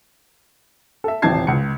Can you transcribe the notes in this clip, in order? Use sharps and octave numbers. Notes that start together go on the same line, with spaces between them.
A4 E5
D#1 A1 C3 A5 G#6 C7
C#2 C#7